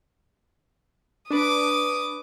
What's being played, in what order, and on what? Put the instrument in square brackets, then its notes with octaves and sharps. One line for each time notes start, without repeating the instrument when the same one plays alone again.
[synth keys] D4 B4 [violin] D6 D#6